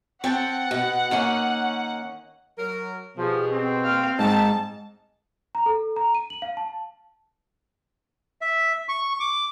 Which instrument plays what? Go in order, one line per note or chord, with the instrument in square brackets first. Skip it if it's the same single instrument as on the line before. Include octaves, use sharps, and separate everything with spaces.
[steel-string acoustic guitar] C4 G5 A5 [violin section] F#5
[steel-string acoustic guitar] B2
D#3 A#3 C#4
[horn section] F#3 A#4
[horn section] B2 [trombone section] F3 [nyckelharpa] G4 G#4
[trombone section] C4
[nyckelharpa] F5 G5
[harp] G#2 [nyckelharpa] D#4 [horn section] A5
[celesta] A#5
A4
A#5
D#7
F#7
F5
A5
[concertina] E5
C#6
D6